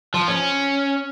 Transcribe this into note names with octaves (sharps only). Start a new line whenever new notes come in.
F3
C#4